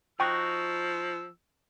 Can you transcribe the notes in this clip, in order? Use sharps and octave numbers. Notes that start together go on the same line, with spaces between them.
F3 D#4 F#4 G5 C#6 E6